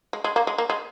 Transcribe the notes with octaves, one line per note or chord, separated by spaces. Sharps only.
G#3
G#3
A#3
G#3
A#3
G#3